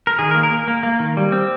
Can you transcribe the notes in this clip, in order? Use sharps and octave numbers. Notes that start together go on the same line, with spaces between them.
A#4
D#3 G#4
A#4
A#3
A#4
A#3
A#3
A#3
D#3
G3
C4